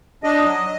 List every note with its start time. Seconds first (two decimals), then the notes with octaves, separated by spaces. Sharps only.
0.24 D4 D#5
0.44 F#3